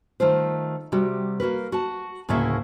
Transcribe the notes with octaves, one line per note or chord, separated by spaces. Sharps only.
D#3 A3 F4 C5
C3 G3 F#4
A#3 F#4 A#4 B4
F#4 A5
D2 A2 C#3 A3 A#3 E5